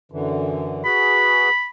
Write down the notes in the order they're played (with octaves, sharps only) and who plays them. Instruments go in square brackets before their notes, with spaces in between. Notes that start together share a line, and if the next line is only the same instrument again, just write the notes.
[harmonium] F#2 D3 E3
[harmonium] F#4 G#4 B4 [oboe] B5